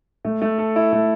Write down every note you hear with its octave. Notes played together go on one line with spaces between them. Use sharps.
A3
A3
A4
E4
A3